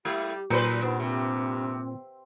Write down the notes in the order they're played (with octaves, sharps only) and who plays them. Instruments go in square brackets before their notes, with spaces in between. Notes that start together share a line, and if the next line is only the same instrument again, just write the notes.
[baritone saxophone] G3 [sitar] A3 E4 [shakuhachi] G4
[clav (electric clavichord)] A#2 [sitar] F#3 B4 C5 [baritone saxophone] D#4
[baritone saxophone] G2 [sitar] B3 [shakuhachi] D#4
[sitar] C3 [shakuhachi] C4